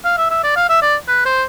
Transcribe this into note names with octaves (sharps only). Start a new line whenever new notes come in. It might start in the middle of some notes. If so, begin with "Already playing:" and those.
F5
E5
E5
D5
F5
E5
D5
B4
C5